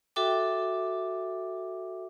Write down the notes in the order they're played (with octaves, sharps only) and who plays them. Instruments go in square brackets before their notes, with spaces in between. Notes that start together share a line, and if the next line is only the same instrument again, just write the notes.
[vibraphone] F#4 A4 E5 G5 D6